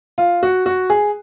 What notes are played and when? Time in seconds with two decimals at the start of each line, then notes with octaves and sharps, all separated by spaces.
0.18 F4
0.43 F#4
0.66 F#4
0.90 G#4